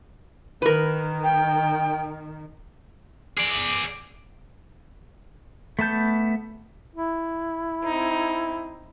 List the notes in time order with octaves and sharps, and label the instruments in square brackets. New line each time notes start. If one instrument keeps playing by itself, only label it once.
[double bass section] D#3 [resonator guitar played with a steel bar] A#4 B4
[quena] G5
[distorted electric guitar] G#4 D5
[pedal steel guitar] A3 B3 A5 G6
[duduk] E4
[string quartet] C4 D#4